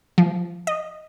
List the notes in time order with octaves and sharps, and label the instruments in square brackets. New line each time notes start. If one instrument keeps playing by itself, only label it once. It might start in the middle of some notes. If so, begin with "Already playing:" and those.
[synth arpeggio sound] F3
D#5